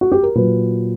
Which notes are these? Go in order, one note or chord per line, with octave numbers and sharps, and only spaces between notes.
F#4
G4
A#4
A#2 F#3 B4